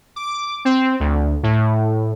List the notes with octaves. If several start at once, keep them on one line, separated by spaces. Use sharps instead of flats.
D6
C4
D2
A2